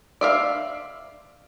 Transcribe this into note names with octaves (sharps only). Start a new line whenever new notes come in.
D5 E5 F5